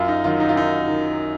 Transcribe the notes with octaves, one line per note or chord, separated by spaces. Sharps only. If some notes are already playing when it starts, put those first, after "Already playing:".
Already playing: F#2 F4
D#4
D#3 F#3 F4
D#4
F4
F#2 D#4
D#3